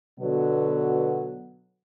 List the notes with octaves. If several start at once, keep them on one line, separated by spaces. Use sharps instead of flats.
B2 D3 F#3 B3